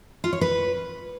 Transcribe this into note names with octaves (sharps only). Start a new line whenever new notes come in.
F4
C#5
B4